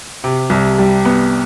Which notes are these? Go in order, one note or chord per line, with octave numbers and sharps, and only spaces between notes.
C3
C2
G3
B3